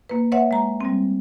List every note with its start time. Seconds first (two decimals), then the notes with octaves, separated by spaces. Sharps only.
0.09 A#3 B4
0.32 B4 C#5 E5 F#5
0.51 G#3 A#5
0.81 G3 C4